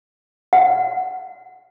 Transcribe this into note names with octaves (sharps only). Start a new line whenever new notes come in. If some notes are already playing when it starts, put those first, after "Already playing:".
F#5